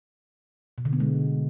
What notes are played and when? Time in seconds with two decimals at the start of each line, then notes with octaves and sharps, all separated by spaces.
0.78 B2
0.85 D3
0.93 B3
1.00 G#3